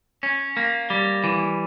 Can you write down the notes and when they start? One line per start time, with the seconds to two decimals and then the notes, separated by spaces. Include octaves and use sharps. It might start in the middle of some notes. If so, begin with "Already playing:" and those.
0.23 C#4
0.57 A#3
0.90 G3
1.24 E3